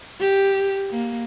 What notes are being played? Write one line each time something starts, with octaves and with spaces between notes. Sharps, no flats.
G4
A#3